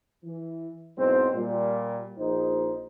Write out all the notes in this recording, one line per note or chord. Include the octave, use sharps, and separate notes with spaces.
E3
G#2 B2 F#3 C4 E4 C5
A#2 G3
A#1 D#4 C5